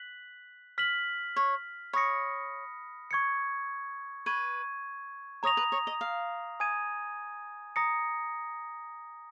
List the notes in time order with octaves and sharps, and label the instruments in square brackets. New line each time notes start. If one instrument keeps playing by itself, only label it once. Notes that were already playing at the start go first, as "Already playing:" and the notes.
Already playing: [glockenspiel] F#6 B6 F#7
F6 B6 F#7
[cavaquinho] C#5
[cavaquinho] C#5 [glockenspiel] B5 D#6 A#6 C#7
[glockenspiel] C#6 G#6 C#7
[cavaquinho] B4 [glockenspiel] C#6 G#6 D#7
[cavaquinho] C#5 [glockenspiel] A#5 D#6 A#6 F7
[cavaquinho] B4
C#5
D#5
F5
[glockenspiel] G#5 D#6 G#6 D#7
A#5 D#6 A#6 C#7